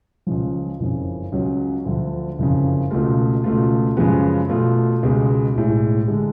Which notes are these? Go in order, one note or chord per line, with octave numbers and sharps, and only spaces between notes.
C#2 C#3 F3
F#1 F2 C#3
C#2 C#3 F#3
D2 D3 F3
F#1 F2 C#3
C#2 B2 A3 F4
C#2 B2 A3 F4
F#2 C#3 F3 G#3 B3
B2 A3 F4
C#2 B2 G#3 B3
B1 A2 G#3
D3 G#3